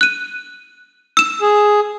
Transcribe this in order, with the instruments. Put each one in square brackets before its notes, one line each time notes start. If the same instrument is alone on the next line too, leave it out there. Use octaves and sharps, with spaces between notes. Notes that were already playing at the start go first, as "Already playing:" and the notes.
[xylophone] F#6 D#7
E6 E7
[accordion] G#4